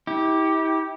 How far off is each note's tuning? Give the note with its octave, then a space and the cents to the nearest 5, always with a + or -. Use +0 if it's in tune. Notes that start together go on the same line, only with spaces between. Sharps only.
E4 -40 G4 +0